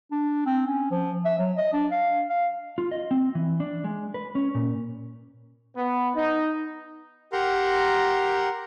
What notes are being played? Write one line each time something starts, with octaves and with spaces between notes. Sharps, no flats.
D4
C4
C#4
F3
E5
F#3
D#5
D4
F5
F5
F4
D#5
C4
E3
D4
G#3
B4
C#4
A#2
B3
D#4
G4 A#4 F#5 A#5 C6